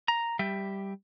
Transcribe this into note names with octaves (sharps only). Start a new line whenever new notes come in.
A#5
G3 G4 E5